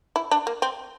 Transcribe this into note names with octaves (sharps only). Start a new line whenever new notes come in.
E4
D4
A#3
C4